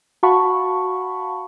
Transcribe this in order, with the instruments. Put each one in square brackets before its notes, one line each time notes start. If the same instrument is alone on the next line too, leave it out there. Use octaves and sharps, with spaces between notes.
[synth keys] F#4 F5 F#5 A5 B5 C#6